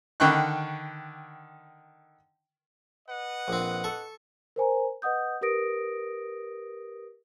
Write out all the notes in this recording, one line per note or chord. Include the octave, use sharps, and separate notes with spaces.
D3 D#3 G5 B5 C#6 F#6
B4 D#5 F#5
A#1 C4
A4 C#6
A#4 C5 G#5 A#5
B4 D#5 F#5 D#6 G6
G4 A#4 B4 D#6 A#6 D7